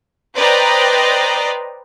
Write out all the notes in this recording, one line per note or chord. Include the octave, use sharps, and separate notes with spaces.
B4 C5 D5 D#5 G5 A#5